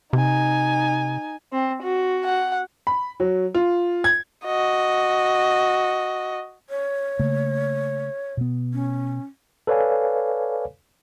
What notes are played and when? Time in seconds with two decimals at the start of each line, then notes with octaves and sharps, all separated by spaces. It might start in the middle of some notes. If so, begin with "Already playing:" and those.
0.13 C3 D#4 G#5
1.53 C4
1.83 F#4
2.25 F#5
2.87 B5
3.20 F#3
3.55 F4
4.04 G#6
4.46 F#4 D#5
6.70 C#5
7.19 C#3 A3 A#3
8.37 B2 B3
8.74 C#4
9.67 A4 B4 C#5 D5 F5 G#5